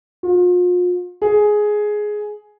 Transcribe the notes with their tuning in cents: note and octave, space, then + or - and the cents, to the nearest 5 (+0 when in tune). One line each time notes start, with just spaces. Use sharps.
F4 +40
G#4 +10